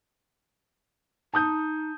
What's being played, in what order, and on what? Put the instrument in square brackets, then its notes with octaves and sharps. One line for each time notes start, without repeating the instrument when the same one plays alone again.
[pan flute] D#4 [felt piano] A5 D#6 G6